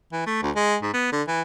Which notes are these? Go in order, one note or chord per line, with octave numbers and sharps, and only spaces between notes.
E3
A3
D2
G#3
G#2
B3
D3
E3